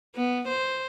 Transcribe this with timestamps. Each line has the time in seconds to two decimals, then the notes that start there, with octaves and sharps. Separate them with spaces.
0.15 B3
0.49 C5